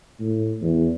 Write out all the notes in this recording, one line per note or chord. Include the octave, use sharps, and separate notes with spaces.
A2
E2